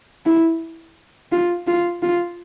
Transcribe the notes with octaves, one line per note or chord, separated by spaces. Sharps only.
E4
F4
F4
F4